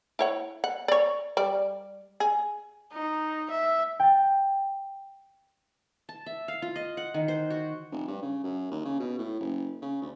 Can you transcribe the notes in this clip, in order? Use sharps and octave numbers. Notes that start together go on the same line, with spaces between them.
E4 C#5 F#5
F#5
C#5 D5
G3 D5
G#4
D#4
E5
G5 A6
A5
E5
F5
F4
D#5
F#5
D#3
C5
F#4
F1
G2
C#3
F#2
D#2
C#3
B2
A2
F#1
C#3
D2